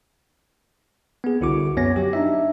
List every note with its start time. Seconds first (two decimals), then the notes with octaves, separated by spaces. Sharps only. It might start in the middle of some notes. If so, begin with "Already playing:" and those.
1.24 B3 G#4
1.41 C2 D3 E4 F#4 D6
1.77 F#2 B3 C#5 G#5 A#6
1.96 F#3 G4
2.13 D4 D#4 E5